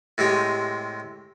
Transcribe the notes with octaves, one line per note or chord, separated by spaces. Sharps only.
A2 C3 G#3 G4